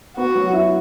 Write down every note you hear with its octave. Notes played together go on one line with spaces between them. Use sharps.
B3 F#4
F#3
E4